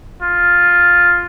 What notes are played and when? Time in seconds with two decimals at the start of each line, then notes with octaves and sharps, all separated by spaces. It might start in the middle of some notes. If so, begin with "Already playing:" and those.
0.22 F4